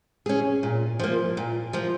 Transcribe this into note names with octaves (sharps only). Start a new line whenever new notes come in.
C#4 G#4
A#2
F3 A#3
A#2
F3 A#3